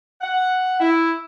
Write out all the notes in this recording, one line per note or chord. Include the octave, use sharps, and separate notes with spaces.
F#5
E4